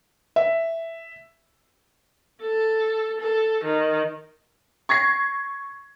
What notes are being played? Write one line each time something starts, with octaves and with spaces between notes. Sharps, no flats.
E5
A4
A4
D#3
C#6 G#6 A#6 C7